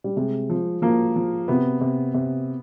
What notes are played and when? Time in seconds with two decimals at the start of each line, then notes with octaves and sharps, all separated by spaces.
0.04 G3
0.17 C3 G#3
0.50 F3
0.82 F3 A#3
1.16 F3
1.48 C3 B3
1.81 C3
2.14 C3